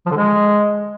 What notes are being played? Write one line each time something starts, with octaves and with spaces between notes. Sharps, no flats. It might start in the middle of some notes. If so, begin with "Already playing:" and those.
F3
D3
G#3